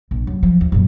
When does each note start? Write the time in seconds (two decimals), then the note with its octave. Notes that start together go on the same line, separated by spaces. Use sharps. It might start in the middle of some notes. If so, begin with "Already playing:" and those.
0.11 A#1
0.27 F#2
0.43 F3
0.61 E2
0.72 F#2 A#2